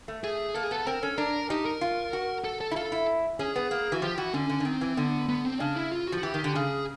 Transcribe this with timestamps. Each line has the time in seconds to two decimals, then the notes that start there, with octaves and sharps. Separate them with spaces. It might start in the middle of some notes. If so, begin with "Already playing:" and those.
0.08 A3
0.24 A3 G#4
0.55 A#3 A4
0.64 G#4
0.71 B3 A4
0.87 C4 A#4
1.02 C#4 A4
1.18 D4 A#4
1.50 D#4 G4
1.65 A#4
1.81 F4
2.13 F#4
2.44 A4
2.61 A4
2.71 E4
2.76 F4 A4
2.92 E4
3.39 C#4 G#4
3.56 B3
3.71 A#3
3.92 E3 F#4
4.02 F3 G4
4.18 E3 F#4
4.34 D3 C#4
4.50 D3
4.60 D3
4.65 D#3 C4
4.81 E3
4.97 D3 B3
5.28 B3
5.45 C4
5.60 C#3 D4
5.76 E4
5.92 F4
6.08 F#4
6.12 F3
6.18 F#4
6.23 E3 G4
6.34 D#3
6.44 D3
6.55 C#3 G#4